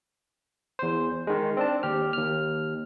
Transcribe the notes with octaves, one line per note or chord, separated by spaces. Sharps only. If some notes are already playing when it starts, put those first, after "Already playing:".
E2 C5
D#3 G#3
C4 D4 A5
D#2 G4 F6
D#2 F6